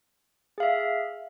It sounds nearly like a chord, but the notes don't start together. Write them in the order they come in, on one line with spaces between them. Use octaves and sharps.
G#4 F5 E5